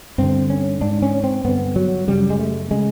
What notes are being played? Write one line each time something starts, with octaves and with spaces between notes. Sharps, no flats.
G2 D3 C4
C#4
G#2 D4
C#4
C4
G2 D3 B3
F#3
F#2 C#3 G3
G#3
A3
C#3 G#3